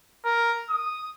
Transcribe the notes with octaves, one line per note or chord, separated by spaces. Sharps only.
A#4
D#6